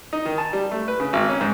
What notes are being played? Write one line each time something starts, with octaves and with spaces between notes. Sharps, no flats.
D#4
D#3
A5
G3
A3
B4
C#3
G#1
C#4
G#2